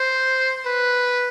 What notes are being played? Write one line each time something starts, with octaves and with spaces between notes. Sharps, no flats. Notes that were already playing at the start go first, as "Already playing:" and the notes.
Already playing: C5
B4